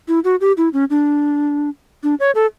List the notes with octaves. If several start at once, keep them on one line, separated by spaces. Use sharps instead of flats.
E4
F#4
G4
E4
C#4
D4
D4
C#5
A4